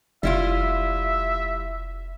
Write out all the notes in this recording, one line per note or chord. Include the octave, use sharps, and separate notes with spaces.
F1 G3 E4 F4 E5